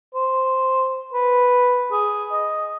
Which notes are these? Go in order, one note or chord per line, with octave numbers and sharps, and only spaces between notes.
C5
B4
G#4
D#5